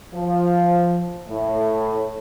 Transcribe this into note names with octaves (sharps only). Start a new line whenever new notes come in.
F3
A2